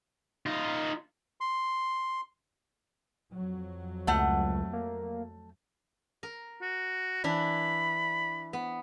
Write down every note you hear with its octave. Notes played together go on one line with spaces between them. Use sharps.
D#4 F4
C6
F2 F#3
C#2 A3 F#5
A#3
A#4
F#4
E3 D4 E4 B5
B3